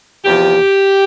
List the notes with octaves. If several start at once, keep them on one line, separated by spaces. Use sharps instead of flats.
E2 C3 F3 G4